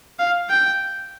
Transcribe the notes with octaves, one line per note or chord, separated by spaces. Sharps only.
F5
G5